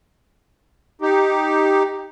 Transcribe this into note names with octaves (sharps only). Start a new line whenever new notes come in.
D#4 G4